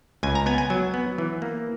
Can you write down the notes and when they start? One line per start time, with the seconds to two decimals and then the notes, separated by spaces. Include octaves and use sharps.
0.23 C#2 G#5
0.35 A#5
0.46 B3 G#5
0.58 G#5
0.70 F#3
0.94 B3
1.18 E3
1.42 A#3